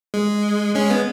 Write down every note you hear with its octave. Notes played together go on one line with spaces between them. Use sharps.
G#3
G#3 C#4
B3